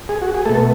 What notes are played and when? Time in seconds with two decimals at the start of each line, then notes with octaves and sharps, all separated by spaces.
0.09 G#4
0.22 F#4
0.34 G#4
0.45 B2 A3 A4